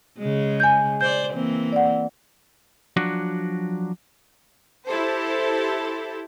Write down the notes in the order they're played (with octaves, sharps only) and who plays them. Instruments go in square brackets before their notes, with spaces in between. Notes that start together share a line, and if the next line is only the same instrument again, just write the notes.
[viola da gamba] C#3 G#3
[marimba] G#5 G6
[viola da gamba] C5 D5 [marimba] G6
[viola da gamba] E3 A#3 C4
[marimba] D5 F#5
[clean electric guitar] F3 F#3 D4 F#4
[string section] E4 G4 A4 C5